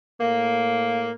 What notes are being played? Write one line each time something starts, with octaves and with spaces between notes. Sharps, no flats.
A2 A#3